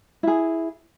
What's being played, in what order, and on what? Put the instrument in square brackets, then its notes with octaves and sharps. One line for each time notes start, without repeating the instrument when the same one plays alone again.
[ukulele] E4 G#4